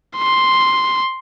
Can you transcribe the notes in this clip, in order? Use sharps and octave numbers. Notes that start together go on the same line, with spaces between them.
C6